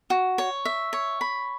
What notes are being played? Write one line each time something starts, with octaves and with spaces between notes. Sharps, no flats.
F#4
C#5
E5
C#5
B5